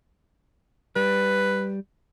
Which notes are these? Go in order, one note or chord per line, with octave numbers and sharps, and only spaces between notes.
G3 B4